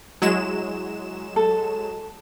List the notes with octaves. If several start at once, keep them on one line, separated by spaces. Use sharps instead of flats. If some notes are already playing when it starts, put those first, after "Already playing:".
F#3 G#3 E4 E7
A4